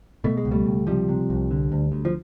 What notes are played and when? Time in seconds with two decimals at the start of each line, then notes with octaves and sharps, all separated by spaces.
0.24 B2 A3
0.37 G#3
0.45 C#2
0.51 G3 A3
0.66 C#2
0.87 C3 F3 G3
1.09 C3
1.30 C2
1.51 D3
1.72 D2
1.92 D2
2.05 F3